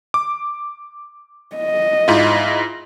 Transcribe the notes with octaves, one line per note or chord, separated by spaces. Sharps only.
D6
D#5
G#2 E4 F4